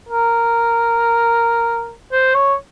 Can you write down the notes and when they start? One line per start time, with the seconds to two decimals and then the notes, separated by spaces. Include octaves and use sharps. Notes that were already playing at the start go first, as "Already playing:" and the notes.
0.09 A#4
2.12 C5
2.34 C#5